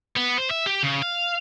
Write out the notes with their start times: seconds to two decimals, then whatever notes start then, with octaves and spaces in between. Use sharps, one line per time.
0.16 B3
0.37 C5
0.50 E5
0.66 G4
0.83 C#3
1.02 F5